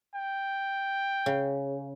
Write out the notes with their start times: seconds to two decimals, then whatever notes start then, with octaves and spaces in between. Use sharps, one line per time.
0.14 G5
1.26 C#3